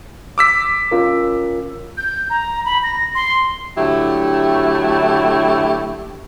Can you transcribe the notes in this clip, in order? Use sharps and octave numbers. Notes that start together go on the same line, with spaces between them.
D6 E6 B6
C#4 F4 A#4
G6
A#5
B5
A#6
C6
D3 F#3 A3 E4 G4